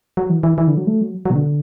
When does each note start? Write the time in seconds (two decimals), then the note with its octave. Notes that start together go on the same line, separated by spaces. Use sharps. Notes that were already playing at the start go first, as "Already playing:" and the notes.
0.17 F#3
0.30 E3
0.43 E3
0.58 E3
0.67 D3
0.77 F#3
0.87 A3
1.01 F#3
1.25 F#3
1.30 B2
1.35 D3